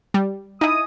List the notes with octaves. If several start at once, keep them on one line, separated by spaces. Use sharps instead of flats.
G3
D#4 E4 D#5 G#5 D#6